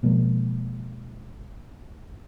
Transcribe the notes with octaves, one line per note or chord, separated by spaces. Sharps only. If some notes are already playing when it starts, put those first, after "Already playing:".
B2 F3 G#3 A#3